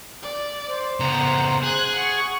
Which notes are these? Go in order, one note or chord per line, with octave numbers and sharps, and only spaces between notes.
D5
C5
C#3 B3 F#5 A#5
G#4 F#6 G#6
F#5 C#6